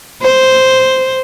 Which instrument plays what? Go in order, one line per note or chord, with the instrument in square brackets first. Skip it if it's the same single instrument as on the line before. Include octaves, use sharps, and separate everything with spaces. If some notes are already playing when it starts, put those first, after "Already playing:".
[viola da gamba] C5